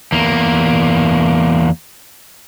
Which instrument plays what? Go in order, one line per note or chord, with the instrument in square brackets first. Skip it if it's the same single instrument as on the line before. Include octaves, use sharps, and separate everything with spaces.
[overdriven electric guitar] E2 A#3